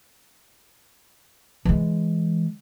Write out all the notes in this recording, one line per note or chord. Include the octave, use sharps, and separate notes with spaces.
E3 G#3